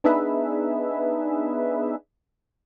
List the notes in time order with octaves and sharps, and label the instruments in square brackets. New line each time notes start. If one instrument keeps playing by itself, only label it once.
[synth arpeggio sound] B3 D4 D#4 G#4 B4 E5